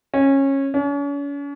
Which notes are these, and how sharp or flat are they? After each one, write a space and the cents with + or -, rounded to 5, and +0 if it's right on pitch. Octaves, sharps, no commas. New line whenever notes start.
C#4 -20
C#4 +40